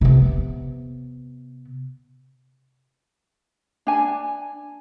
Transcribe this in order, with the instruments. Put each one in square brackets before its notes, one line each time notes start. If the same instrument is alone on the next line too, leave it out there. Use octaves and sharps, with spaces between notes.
[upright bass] C3 B3
[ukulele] D4 G#5